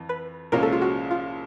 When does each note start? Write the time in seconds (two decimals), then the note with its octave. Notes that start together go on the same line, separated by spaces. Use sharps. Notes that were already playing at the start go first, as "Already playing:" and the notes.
Already playing: F2 E3
0.09 B4
0.52 C2 A#2 F3 G#3 C#4 A#4
0.63 A4
0.72 F4
0.82 F#4
1.11 F4